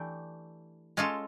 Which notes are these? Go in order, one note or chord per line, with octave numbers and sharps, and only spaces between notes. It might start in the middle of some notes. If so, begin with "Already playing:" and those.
Already playing: E3 A3 D4 G4
G#3 C#4 F4 A4